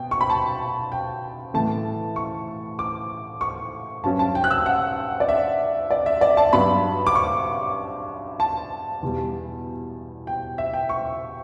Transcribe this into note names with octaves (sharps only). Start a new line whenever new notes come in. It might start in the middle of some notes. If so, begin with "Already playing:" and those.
Already playing: B2 G5
C#6
B5
A5
G5
A2 E3 A3 A5
C#6
D6
C#6
G2 F#3 C#4 A5
A5
G5
F#6
E6
F#5
D5
E5
D5
E5
D5
A5
G2 F#3 B3 B5
D6
C#6
A5
E2 B2 G3
G5
E5
G5
C#6